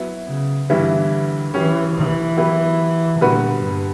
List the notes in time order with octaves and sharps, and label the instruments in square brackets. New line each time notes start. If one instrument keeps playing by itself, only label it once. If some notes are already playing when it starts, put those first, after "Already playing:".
Already playing: [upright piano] F#3 B3 E4
[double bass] C#3
[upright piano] G2 E3 G3 B3 E4 [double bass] D3
[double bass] E3 [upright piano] F#3 C#4 G4
[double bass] E3
[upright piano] F#3 B3 E4 G4 B4
[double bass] A#2 [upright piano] D3 G3 B3 F#4 B4
[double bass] G2